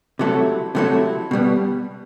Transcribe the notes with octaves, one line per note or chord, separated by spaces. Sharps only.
C3 F#3 A3 E4 A4
C3 F#3 A3 E4 A4
B2 G3 B3